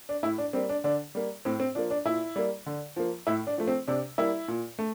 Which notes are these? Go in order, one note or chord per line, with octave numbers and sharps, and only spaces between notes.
D4
A2 E4
D4
G3 A#3 C4
D4
D3 D4
G3 A#3
A2 C4
C4
F3 A#3 D4
D4
A#2 E4
G3 A#3
D3
F3 A#3
A2 E4
D4
F3 A3
C4
C3 D4
G3 A#3 E4
A#2
A3